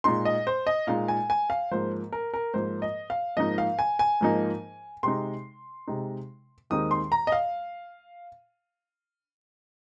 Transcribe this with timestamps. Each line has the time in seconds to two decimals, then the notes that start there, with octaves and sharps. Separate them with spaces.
0.04 A#2 G#3 D#4 C6
0.25 D#5
0.47 C5
0.67 D#5
0.87 A#2 G#3 D#4 F5
1.08 G#5
1.30 G#5
1.50 F5
1.71 G#2 F3 A#3 C5
2.12 A#4
2.34 A#4
2.54 G#2 F3 A#3 C5
2.82 D#5
3.10 F5
3.37 G#2 F3 A#3 D#4 D#5
3.58 F5
3.79 G#5
3.99 G#5
4.21 G#2 F3 A#3 D#4
5.03 C3 G#3 D#4 C6
5.88 C3 G#3 D#4
6.70 D#2 D#3 G#3 C4 D#4 D#6
6.91 C6
7.12 A#5
7.27 D#5
7.32 F5